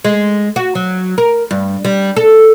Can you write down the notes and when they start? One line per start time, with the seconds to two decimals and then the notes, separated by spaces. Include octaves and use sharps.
0.04 G#3
0.56 F#4
0.75 F#3
1.18 A#4
1.51 G2
1.84 G3
2.16 A4